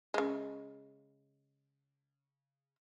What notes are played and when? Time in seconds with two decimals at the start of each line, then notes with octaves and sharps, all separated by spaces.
0.14 C#3 G#3